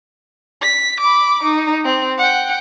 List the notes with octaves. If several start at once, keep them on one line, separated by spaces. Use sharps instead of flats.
B6
B5 D6
D#4
C4
F#5 G5